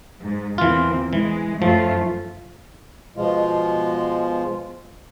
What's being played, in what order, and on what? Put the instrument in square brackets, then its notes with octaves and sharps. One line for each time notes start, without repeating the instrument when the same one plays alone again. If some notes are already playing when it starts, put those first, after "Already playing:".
[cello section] G#2
[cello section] E2 A#3 C4 [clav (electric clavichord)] E3 F4
[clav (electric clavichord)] E3 [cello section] G#3
[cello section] F#2 A3 F4 [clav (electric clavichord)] F3
[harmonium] B2 F3 G#3 F4